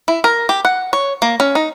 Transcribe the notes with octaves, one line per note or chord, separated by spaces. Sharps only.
E4
A#4
G4
F#5
C#5
A#3
C#4
D#4